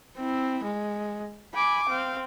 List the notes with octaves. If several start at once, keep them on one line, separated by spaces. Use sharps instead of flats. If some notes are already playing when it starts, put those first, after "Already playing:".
C4 E4
G#3
G#5 B5 D6
C4 F5